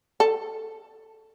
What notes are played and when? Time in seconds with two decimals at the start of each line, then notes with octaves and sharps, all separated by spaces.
0.20 A4